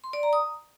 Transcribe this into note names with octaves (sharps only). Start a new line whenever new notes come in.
C6
D5
A#5
D#6